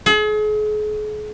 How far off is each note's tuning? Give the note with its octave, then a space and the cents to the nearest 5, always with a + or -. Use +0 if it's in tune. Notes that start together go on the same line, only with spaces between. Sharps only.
G#4 +40